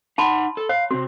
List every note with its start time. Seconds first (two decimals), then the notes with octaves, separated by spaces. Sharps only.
0.18 D#4 F#5 A5 B5 C6
0.57 A4
0.69 C#5 F5
0.91 C3 C4 F#4